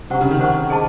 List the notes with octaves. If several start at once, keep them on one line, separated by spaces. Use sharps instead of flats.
C3 C5 F#5 C#6
C#3
D#3
C5 F#5 C#6
G#4 D#5 A5